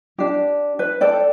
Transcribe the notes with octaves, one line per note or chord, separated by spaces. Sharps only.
D4 G4
B4
A4 D5 G5